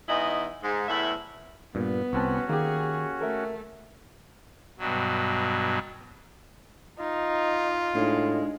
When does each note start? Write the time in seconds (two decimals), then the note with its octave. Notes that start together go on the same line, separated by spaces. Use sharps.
0.08 E2 G#2 E4 D#5
0.63 G#2
0.88 E2 A2 E4 E5
1.75 G2 A#2 B3
2.13 C2 C4 C#4 F#4 A5
2.49 D#3 A#3 G4 G#4
3.21 A3 A4 A#4 E5
4.79 G2 B2 F#3
6.99 D#4 F4
7.95 A2 G#3 D4 D#4